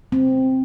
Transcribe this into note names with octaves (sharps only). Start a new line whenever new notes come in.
C4